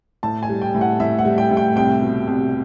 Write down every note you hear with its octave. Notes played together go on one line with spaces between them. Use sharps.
A2 A5
G#5
G3
G5
A2
F#5
A2 E5
F#5
G3
G5
A2
G5
C2 G5
B2
C2